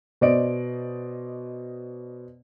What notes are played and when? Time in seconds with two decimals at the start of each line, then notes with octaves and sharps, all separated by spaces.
0.21 B2 C5 D5 D#5 D7